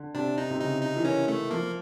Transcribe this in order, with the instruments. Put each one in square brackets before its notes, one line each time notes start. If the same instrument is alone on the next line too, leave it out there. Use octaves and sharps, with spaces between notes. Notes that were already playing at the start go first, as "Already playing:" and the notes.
Already playing: [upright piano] D3
[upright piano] C3 [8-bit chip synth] D4
[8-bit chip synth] D#4
[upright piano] C3
[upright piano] C#3 [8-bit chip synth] D#4
[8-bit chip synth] D#4
[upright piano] E3
[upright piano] D#3 [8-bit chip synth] C#4
[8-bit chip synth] A3
[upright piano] F3 [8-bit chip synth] A#3